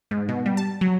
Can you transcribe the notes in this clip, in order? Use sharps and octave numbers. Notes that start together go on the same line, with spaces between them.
G#2
B2
G3
A5
F#3